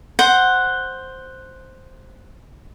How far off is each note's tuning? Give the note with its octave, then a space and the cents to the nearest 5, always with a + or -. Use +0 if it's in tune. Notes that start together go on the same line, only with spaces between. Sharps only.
C5 +0 F#5 +0